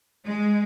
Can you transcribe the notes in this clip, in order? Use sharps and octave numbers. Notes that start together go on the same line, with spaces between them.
G#3